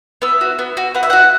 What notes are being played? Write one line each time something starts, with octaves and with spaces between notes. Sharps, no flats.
B3 E5
F#4
B3
F#4
B3 F#5
E5
F#4 F#5